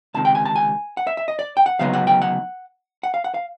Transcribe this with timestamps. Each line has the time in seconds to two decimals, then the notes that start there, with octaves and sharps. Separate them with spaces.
0.14 C#2 C3 D#3 A5
0.25 G5
0.35 G#5
0.45 A5
0.56 G#5
0.97 F#5
1.07 E5
1.17 E5
1.28 D#5
1.39 D5
1.57 G5
1.66 F#5
1.79 D2 C#3 F#3 B3 D#4 F5
1.93 F#5
2.07 G5
2.22 F#5
3.03 F#5
3.14 F5
3.24 F#5
3.34 F5